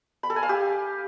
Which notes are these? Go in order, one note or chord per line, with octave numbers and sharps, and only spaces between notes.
B5
A4
G#5
F5
G4